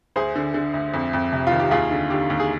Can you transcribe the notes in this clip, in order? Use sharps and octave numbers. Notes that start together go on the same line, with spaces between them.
D2 G#4 C5
D3
D3
D2
F2
F2
C3
F4
D#3
G4
D#2 F4 G#4
D3
D3 G4
D#2
G#4